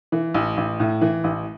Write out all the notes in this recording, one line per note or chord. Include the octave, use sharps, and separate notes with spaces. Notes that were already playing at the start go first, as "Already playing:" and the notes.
E3
A1
A1
A2
E3
A1